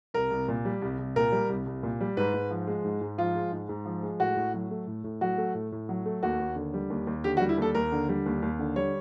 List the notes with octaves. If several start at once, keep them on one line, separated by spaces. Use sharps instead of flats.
C2 A#4
C2
A#2
G3
C2
C2
A#2 A#4
G3
C2
C2
A#2
G3
G#2 B4
G#2
F3
G#3
G#2
G#2
F3 F4
G#3
G#2
G#2
F3
G#3
A2 F#4
A2
F#3
A3
A2
A2
F#3 F#4
A3
A2
A2
F#3
A3
D#2 F#4
D#2
D3
G3
D#2
D#2
D3 G4
F#4
G3
E4
D#2 A4
D#2 A#4
D3
G3
D#2
D#2
D3
G3 C#5